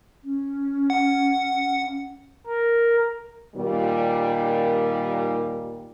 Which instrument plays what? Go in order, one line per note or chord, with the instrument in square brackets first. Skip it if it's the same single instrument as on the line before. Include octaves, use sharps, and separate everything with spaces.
[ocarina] C#4
[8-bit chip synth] F#5
[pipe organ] A#4
[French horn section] A#2 D#3 G3